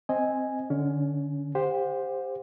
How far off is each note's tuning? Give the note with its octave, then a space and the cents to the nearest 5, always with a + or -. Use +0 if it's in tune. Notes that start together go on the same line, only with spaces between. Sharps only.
C4 +0 D#5 +0 G#5 +0
D3 +5 C#4 +25
G4 +15 C5 +0 F#5 -40